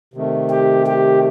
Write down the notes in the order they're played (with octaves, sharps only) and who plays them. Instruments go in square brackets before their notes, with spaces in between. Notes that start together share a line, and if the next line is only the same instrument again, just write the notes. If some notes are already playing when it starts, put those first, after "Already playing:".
[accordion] C3 D#3 A3
[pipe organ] G4
G4